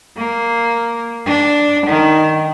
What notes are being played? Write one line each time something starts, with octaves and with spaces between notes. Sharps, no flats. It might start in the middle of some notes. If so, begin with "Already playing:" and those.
A#3
D4
D#3